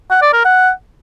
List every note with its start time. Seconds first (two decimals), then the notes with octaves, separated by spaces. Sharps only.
0.11 F#5
0.22 D5
0.33 A#4
0.45 F#5